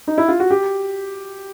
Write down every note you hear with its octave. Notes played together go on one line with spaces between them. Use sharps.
D#4
E4
F4
F#4
G4